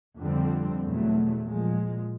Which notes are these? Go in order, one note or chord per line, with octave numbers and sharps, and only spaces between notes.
F2 D3 G3 C4
E2 B2 F#3 A3
A#2 F3 G#3